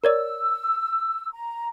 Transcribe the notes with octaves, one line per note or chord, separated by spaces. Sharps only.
A#4 C#5 D5 E6
A#5